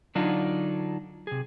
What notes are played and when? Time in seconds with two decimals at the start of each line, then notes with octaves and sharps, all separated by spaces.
0.15 D3 F#3 D4 D#4 F4
1.27 C3 G#4